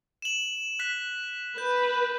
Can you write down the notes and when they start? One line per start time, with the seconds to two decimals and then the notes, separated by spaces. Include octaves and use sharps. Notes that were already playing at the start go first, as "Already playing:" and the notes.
0.22 E7 F#7
0.79 F#6 B6
1.58 B4 G6